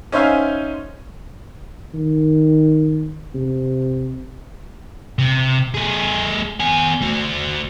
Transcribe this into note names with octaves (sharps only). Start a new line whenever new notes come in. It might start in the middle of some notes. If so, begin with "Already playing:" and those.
C#4 D#4 C5 E5 F5 G#5
D#3
C3
C3
A3 G#4
B3 G#5
A3 F#4